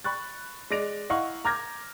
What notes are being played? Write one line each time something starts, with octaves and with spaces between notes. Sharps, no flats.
B5 C#6 F#6 A6
G#3 D5 A#6 D7 F7
E4 D#5 F5 F#5 A#5 C#6
A#5 D6 F6 G6 G#6 A#6